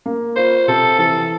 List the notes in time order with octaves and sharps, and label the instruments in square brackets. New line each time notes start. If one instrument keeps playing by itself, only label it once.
[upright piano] A#3
[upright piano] F4 [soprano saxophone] C5
[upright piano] C3 [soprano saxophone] A4
[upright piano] E3 [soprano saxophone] A4